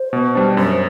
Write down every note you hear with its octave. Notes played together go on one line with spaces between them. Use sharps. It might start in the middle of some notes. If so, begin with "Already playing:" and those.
Already playing: C5
B2
G3 D4
F#2 C5